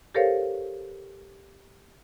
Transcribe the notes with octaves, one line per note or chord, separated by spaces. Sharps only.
G4 A4 A#4 C5 C#5 F5